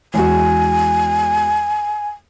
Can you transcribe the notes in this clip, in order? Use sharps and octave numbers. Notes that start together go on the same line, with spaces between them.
E2 G#3 F#4 G#5